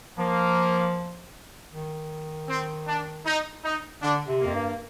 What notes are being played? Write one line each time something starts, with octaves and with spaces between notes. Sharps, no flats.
F3 A#3
D#3
C4
D4
D#4
D#4
D3 D4
C3
A#3
F2
G2